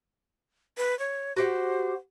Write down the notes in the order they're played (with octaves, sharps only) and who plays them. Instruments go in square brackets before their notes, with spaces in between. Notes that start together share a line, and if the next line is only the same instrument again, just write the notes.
[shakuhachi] B4
C#5
[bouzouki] F#4 G4 F#5 [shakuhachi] C5